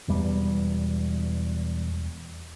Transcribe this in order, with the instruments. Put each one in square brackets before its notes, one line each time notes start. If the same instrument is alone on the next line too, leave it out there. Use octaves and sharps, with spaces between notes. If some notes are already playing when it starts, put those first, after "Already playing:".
[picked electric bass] E1 E2 G3